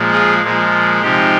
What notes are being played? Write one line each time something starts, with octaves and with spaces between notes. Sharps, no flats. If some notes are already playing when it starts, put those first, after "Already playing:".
Already playing: A#2 F3 G#3
F4 G#4
A#2 F3 G#3
C3 F3 G#3 D#4 G4